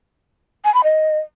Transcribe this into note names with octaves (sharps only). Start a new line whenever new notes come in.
G#5
B5
D#5